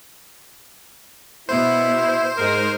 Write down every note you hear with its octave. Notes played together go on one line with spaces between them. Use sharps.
B2 B3 E4 C5
G#2 G#3 D#4 A#4